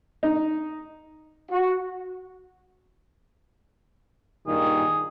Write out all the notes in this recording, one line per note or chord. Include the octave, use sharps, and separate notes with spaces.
D#4
F#4
G2 A#2 D#3 G#4